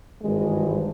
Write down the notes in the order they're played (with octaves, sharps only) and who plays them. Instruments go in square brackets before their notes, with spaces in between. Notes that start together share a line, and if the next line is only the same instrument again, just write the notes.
[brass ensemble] G#1 G2 E3 G#3